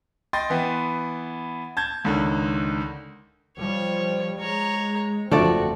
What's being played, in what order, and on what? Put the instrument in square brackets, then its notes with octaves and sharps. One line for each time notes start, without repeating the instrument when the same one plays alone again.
[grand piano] D#5 G5 C6 A6
E3 B3
A5 G6 G#6
C#2 D3 D#3
[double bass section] F3 G3 [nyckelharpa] C#5
[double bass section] G#3 [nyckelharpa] C#5 A#5
[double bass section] F#1 E2 C4 [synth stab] D3 F3 [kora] A3 D5 [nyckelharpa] F#4